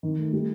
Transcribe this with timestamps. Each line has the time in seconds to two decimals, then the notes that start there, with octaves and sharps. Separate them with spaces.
0.03 D#3
0.18 A3
0.33 G3